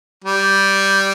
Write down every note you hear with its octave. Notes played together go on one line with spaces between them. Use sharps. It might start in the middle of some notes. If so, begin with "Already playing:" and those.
G3